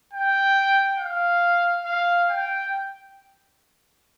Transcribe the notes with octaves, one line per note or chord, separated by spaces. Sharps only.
G5
F5
F5
G5